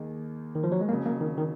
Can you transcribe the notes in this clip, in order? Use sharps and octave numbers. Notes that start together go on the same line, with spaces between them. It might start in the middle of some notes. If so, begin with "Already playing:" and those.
Already playing: D#2 D#3 A#3 D#4 G#4
D#3
F3
F#3
G#3
F2 C#3 F#3 A#3
A#3
D#3
D#3